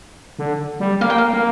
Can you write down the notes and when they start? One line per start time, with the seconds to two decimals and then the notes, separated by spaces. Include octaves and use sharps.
0.39 D3
0.80 G3
1.01 A#3 F5
1.10 G5
1.18 F5
1.33 A#3